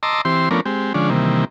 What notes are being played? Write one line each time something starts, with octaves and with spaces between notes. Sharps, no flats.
D#5 A5 A#5 C6 D6 E6
E3 C4 G4 C6
F3 A3 B3 C#4 D4 A#4
G#3 C4 G4
D3 F3 G#3 C#4 D4
C3 D#3 E3 G3 A#3